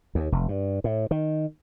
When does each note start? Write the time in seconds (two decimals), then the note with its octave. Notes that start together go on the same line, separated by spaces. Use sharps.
0.15 D#2
0.32 F1
0.48 G2
0.84 A2
1.11 D#3